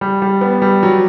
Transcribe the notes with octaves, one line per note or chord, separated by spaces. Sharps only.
G3
G3
B3
G3
F#3